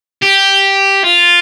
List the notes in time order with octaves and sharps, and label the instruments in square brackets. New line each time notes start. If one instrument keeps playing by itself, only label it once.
[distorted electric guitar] G4
F4